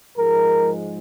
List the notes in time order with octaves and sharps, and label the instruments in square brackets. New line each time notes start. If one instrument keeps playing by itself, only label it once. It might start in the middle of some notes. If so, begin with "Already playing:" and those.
[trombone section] G#2 F3 G#3 A#4